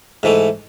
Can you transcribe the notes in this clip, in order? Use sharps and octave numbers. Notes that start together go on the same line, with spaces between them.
G#2 E3 A3